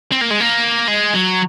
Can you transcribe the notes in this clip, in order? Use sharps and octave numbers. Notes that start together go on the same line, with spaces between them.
C4
A#3
G#3
A#3
G#3
F#3